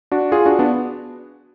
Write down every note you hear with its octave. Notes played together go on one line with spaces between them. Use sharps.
D4 F#4
F4 G#4
D4 F#4
B3 D4